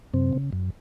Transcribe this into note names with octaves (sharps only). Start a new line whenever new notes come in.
F#2 C3 C4
C#3
F#2